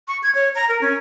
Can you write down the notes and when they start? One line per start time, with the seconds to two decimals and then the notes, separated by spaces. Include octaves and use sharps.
0.08 C#6
0.23 G#6
0.35 C#5
0.55 A#5
0.69 A#4
0.81 C#4